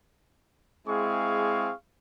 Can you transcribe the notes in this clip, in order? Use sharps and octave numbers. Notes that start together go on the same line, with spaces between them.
G#3 C4 E4 G#4 F5 C#6